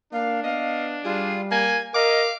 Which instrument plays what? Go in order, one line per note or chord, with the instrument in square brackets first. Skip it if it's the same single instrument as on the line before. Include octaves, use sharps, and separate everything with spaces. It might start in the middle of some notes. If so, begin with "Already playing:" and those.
[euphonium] A#3 [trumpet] D4 [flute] F5
[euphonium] B3 [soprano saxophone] D#5 [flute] F5
[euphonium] G3 [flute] F4 [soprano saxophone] G#4
[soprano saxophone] A#3 [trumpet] G#5 [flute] G#6
[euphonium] A#4 [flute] D#5 [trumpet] F5 [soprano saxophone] D6